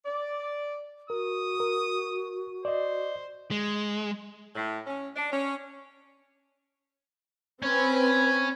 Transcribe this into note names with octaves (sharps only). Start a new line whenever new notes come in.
D5
F#4 A#4 D#6
A#4
C5 D5 D#5
G#3
A2
C#4
D4
C#4
C4 C#4 B4 B5